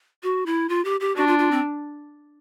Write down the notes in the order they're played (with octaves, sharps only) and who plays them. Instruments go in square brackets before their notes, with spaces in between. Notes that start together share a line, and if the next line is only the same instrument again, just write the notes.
[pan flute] F#4
E4
F4
G4
G4
[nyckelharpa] D4 [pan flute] F#4
[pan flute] F4
F4
C4